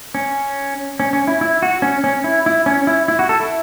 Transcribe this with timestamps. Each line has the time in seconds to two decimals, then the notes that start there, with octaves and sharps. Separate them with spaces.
0.15 C#4
1.00 C#4
1.13 C#4
1.28 E4
1.41 E4
1.62 F#4
1.82 C#4
2.04 C#4
2.24 E4
2.46 E4
2.66 C#4
2.87 E4
3.08 E4
3.19 F#4
3.29 A4
3.40 E4